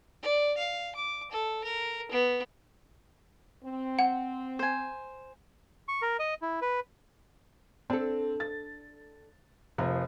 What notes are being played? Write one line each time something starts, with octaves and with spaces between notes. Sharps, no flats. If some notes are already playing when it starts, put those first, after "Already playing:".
D5
F5
D6
A4
A#4
B3
C4
F#5
C5 G#5
C#6
A#4
D#5
E4
B4
C4 D4 A4
A6
F1 F3 A#3